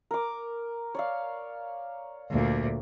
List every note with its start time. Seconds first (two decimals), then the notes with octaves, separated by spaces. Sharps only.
0.11 A#4 D6
0.95 C#5 D5 F5
2.31 D2 A#2